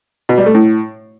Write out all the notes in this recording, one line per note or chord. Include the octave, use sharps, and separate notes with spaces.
B2
G3
A3
A2